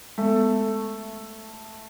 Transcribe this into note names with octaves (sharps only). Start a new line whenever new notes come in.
G#3 A3 B3